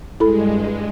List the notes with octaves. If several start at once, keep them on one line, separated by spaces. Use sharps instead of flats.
G2 G#3 E4 A4 B5